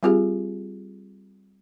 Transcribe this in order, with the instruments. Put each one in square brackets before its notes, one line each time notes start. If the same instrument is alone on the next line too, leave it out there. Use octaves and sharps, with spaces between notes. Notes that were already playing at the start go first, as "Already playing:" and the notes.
[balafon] G3 C4 F4 G4 G#4